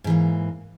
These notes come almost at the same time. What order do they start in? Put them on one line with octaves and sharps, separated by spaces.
G#2 E3 A#3